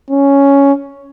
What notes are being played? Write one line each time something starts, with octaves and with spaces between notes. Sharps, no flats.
C#4